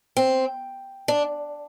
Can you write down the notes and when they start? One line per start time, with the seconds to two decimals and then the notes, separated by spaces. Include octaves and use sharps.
0.17 C4
1.08 D4